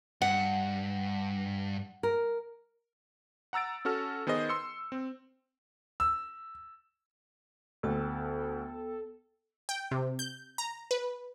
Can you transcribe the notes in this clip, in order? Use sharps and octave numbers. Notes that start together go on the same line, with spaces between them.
G2 F#5
A#4
F#5 A#5 E6 A6 D7
C#4 F#4 A4 F6
D#3 B3 G#4 C5 D#5
C6 E6 C#7
C4
E6
D2 B3 A4 G5 A5
G5
C3
G6
A#5
B4